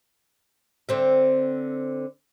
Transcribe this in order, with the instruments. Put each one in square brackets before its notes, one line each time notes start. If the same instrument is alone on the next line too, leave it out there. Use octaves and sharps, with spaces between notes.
[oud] D3 C4 E5